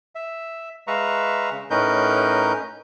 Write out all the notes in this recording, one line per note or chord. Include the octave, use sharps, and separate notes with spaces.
E5
G#3 B4 E5 F5 A#5 C#6
C#3
A2 C#4 D#4 A#4 B4 G6